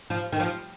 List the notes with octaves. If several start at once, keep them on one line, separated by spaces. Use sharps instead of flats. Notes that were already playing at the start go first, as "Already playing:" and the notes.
F3
D#3
F3